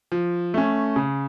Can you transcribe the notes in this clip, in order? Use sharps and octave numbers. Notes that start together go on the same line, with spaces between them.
F3
A3 C#4
C#3